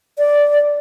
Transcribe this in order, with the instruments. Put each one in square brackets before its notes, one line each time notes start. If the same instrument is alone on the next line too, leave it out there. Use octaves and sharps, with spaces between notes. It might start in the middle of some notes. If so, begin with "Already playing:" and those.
[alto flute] D5